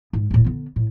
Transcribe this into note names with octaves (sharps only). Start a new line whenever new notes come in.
G#2
D#1 A2
D3 B3
A2